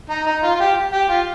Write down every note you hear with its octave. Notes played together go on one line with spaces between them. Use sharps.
D#4
D#4
F4
F4
G4
G4
F4